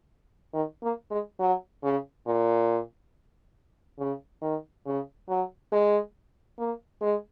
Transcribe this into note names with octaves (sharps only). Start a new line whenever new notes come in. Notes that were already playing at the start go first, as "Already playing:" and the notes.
D#3
A#3
G#3
F#3
C#3
A#2
C#3
D#3
C#3
F#3
G#3
A#3
G#3